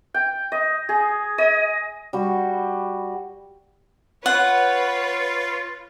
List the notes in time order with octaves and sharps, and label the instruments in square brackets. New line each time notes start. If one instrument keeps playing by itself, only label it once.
[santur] G5
D#5
G#4
D#5
[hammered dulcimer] G3 F#4
[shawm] F4 [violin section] B4 C#5 [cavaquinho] F#5